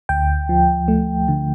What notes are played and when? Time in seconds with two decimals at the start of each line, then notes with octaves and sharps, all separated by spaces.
0.09 D2 G5
0.49 F3
0.88 A3
1.28 D3